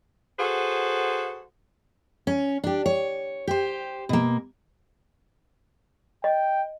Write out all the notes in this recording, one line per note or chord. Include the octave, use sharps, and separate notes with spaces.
F#4 G#4 A4 B4 C5 F#5
C#4
D4 G4
C#5
G4 C5
B2 A#3
D#5 G5